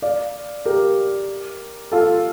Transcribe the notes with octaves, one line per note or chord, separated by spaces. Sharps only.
D5 F5
G4 A#4
F4 A4